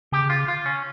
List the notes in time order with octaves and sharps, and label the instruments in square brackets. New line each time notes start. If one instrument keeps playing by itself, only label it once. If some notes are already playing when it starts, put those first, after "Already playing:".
[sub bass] C#3 [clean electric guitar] G4
[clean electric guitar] F4
F4
C#4